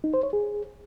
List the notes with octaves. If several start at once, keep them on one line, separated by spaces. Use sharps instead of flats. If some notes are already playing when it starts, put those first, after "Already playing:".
D#4
C5
C#5
G#4